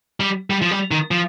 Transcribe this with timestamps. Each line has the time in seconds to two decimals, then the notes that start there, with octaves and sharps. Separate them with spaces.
0.20 G3
0.50 G3
0.62 F3
0.71 G3
0.91 D#3
1.11 F3